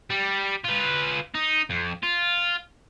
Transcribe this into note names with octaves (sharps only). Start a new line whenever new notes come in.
G3
F4 B4
D#4
F2
F4